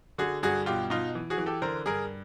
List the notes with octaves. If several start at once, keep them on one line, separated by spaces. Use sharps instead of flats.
D3 F#4 G#4
G2 F#4 G#4
B2 F4 G4
B2 D#4 F4
E3
F#4 G#4
E3
G4 A4
D3 A#4 C5
G2 G#4 A#4